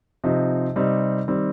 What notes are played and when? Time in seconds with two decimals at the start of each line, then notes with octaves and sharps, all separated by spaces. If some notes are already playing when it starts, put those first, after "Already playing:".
0.24 C3 F3 C4 D#4
0.76 C3 G3 C4 D#4
1.28 D#3 G3 C4